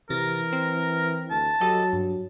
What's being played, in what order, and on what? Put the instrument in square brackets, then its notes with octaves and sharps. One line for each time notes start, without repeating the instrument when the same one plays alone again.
[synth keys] C3 A6 A#6 [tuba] E3 [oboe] A#4
[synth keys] C4
[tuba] D2 [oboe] A5
[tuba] F#3 [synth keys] G4 A4 D#5
[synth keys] G2